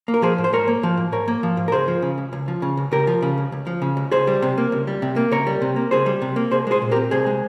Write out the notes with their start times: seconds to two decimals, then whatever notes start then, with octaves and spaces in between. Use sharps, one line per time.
0.08 A#3
0.14 A#4
0.22 F3 G#4 C5
0.38 G#2
0.44 C5
0.53 G#2 A#4 C#5
0.68 A#3
0.83 F3
0.97 G#2
1.12 G#2 A#4 C#5
1.28 A#3
1.43 F3
1.57 G#2
1.68 A#4
1.72 C#2 G#4 C5
1.88 F3
2.02 C#3
2.18 C#2
2.33 C#2
2.48 F3
2.62 C#3
2.77 C#2
2.92 C#2 G4 A#4
3.07 F3
3.22 C#3
3.38 C#2
3.52 C#2
3.67 F3
3.82 C#3
3.97 C#2
4.11 C#2 G#4 C5
4.27 G3
4.42 C3
4.58 A#3
4.72 C#2
4.87 G3
5.02 C3
5.16 A#3
5.32 C#2 A#4 C#5
5.47 G3
5.62 C3
5.76 A#3
5.91 C#2 G#4 C5
6.06 G3
6.22 C3
6.36 A#3
6.51 C2 G#4 C5
6.67 G#3 G#4 C5
6.82 A#2
6.91 G4 A#4
6.96 C4
7.11 C2 G#4 C5
7.26 G#3